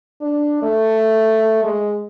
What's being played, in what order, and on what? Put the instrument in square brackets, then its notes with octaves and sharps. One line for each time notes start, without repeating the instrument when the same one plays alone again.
[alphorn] D4
A3
G#3